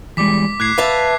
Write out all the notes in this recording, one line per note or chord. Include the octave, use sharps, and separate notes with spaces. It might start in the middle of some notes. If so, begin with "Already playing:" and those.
E3 G3 G#3 D6 B6
A2 F#6 G#6 C7
B4 E5 F5 A5